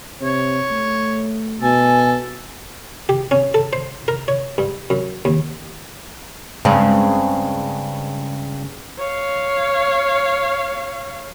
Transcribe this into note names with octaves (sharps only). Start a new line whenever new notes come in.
C3 C#5
A3
B2 A4 G#5
G4
C#4
A4
C5
A#4
C#5
G2
F#2
D#2
G2 C#3 G#3 C4
C#5 F5